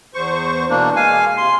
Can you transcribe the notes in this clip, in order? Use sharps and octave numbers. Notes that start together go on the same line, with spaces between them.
E2 C5 C#6
B2 E3 A#3 D4
G#3 F5 G#5
C3 C6